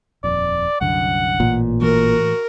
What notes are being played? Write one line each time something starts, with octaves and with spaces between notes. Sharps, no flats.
D#1 F2 D5
C2 F#2 D3 F#5
A1 A#2
A2 E3 A#3 F#4 A#4